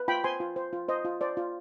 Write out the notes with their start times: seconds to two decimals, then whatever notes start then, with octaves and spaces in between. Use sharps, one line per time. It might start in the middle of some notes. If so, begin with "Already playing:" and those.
Already playing: B4
0.08 F4 G5 B5
0.24 C5 G#5 C6
0.40 F4
0.56 C5
0.73 F4
0.88 C5 D#5
1.05 F4
1.21 C5 D5
1.37 F4